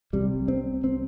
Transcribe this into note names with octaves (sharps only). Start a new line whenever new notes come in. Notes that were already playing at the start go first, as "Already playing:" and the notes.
C2 C3 G3
C4
C4